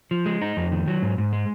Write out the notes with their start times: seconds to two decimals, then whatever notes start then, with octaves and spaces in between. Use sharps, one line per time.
0.11 F3
0.26 G#3
0.42 D#4
0.57 F2
0.72 D#3
0.88 F#3
1.02 G#2
1.18 G#2
1.33 G#3